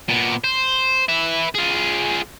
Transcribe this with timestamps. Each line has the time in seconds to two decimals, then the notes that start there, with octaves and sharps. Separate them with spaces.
0.09 A#2 B3
0.44 C5
1.09 B4 E5
1.55 F4 G#4